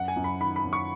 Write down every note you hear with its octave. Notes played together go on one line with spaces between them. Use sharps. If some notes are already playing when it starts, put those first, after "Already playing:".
Already playing: F#2 F#5
G#5
F#2
B5
D#3 B5
B5
F#2
C#6